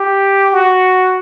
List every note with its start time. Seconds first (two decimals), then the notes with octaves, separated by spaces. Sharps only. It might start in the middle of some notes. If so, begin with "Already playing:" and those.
Already playing: G4
0.53 F#4